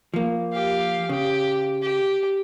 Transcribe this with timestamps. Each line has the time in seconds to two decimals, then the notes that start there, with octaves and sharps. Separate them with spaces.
0.14 F3 A#3
0.53 G4 F5
1.09 C#3 G4
1.82 G4